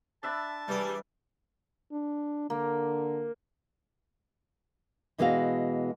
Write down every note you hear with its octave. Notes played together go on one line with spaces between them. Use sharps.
D4 E5 A5 B5
E3 G3 G#4
D4
D3 A#3
B2 E3 G#3 B3 F#4 F5